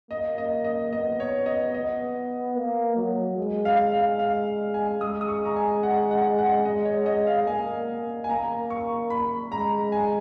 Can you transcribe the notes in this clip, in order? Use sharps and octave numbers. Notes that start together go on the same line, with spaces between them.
A#3 D#5
D#5
D#5
B3 D#5
C#5
D#5
B3 D#5
A#3
F#3
G#3
F5
F5
F5
G#5
G#3 D#6
D#6
C#6
A#5
G#5
F#5
F#5
F#5
D#5
C#5
D#5
F5
A#3 G#5
G#5
A#3 A#5
C#6
B5
G#3 A#5
G#5